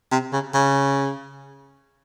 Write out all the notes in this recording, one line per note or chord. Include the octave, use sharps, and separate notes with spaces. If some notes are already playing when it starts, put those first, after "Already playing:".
C3
C#3
C#3